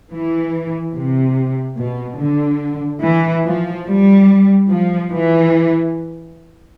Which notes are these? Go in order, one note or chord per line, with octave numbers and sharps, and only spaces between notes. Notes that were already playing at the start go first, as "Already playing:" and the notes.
E3
C3
B2
D3
E3
F3
G3
F3
E3